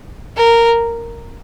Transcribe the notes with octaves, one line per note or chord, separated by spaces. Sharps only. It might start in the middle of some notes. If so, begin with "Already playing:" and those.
A#4